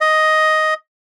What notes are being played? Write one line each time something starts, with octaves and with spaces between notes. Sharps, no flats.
D#5